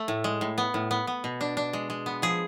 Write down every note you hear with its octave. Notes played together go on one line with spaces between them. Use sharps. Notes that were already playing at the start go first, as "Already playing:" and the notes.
Already playing: A3
A2
G#3
A2
B3
A2
B3
B3
B2
D4
D4
G#3
G#3
B3
F3 G#4